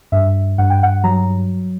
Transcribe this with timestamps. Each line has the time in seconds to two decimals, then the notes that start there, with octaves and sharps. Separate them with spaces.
0.12 G2 E5
0.58 G2 F#5
0.70 G5
0.83 F#5
1.04 F#3 A#5